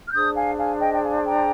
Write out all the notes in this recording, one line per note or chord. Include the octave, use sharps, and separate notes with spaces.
F6
D4 G#4 C5 D#6 G6
F5 G#5
F5 G#5
D#5 G5
G5
F5 G#5
G5 A#5